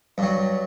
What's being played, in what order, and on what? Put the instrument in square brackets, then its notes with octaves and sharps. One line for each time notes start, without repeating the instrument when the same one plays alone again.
[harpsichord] G2 F#3